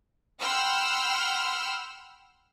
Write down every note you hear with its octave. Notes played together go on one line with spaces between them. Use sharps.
F#5 G5 B5 C6 E6 F6